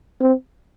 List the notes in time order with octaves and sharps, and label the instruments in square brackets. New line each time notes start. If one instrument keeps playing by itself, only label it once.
[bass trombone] C4